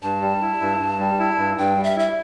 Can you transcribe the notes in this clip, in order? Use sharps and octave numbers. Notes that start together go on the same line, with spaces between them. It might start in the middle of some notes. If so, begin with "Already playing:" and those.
G2 A5
G3
E4
G2
G2
G3
E4
G2
G2 G5
G3
E5
E4 E5